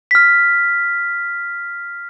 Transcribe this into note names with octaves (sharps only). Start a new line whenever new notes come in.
F6 B6